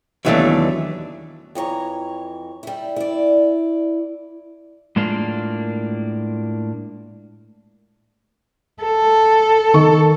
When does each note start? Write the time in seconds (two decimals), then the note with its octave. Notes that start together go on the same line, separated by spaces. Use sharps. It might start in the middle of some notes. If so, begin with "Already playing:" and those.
0.25 D#2 B2 E3 F#3 A3 D4
1.55 F2 E3 C#5 A#5
2.63 G3 E4
2.96 E4 D5
4.96 A2 G#3 A#3 D4 F4
8.83 A4
9.74 D#3 C#6